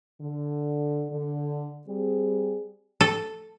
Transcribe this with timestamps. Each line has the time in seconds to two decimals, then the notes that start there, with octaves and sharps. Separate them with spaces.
0.22 D3
1.11 D3
1.87 G3 C4 G#4
3.01 A4